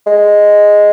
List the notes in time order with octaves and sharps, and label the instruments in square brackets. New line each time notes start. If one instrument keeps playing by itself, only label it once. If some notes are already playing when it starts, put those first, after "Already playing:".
[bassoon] G#3